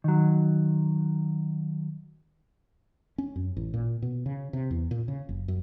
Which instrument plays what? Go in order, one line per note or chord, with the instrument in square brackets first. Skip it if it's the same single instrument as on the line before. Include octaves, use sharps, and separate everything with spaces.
[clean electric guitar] D#3 F#3
[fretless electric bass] C#4
F#2
A1
A#2
B2
C#3
C3
E2
A#2
C#3
F#1
F#2